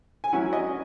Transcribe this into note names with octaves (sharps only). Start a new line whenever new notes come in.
G#5
F#3 C#4 E4 F#5
D#5